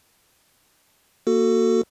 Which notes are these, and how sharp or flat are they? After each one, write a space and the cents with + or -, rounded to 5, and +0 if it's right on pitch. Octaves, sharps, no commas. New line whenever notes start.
A#3 +0 F#4 +0 A4 +20